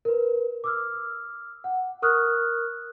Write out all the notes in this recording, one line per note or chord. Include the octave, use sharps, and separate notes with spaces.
A#4 B4
D6 E6 F6
F#5
A#4 C#6 D#6 F6 F#6